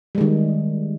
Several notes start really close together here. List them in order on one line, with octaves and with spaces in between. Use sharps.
G3 G#3 D#3